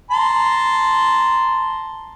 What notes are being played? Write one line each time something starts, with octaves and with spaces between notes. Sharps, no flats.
A5 A#5 C6